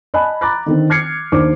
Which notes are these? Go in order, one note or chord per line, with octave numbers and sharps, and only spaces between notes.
D5 D#5 G#5 A5 B5 F#6
A#5 B5 D6 F#6 A6
D3 D#3 C4
D6 F6 G#6 C7 C#7
D#2 D4 C5 D5 D6